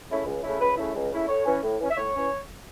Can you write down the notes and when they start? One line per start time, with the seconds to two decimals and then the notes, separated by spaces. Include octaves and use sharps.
0.09 C#3 A3 C#4 E4
0.26 C#2
0.43 C#3 A3 C#4 E4
0.60 C#2 B4
0.77 C#3 A3 C#4 E4
0.95 C#2
1.11 C#3 A3 C#4 E4
1.28 A2 C#5
1.45 E3 C#4
1.63 A2
1.80 E3 C#4
1.90 E5
1.97 A2 C#5
2.15 E3 C#4